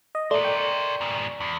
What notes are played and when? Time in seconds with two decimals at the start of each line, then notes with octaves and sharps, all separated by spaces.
0.15 D#5
0.31 A3 A#4 C5 D5
0.43 G5 C#6
1.01 G#2 B2
1.40 E2